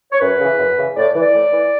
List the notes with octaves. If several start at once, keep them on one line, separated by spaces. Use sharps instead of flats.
C#5
F#2 B4
C#3 E3
F#2
C#3 E3
A2 D5
E3
D5
A2
E3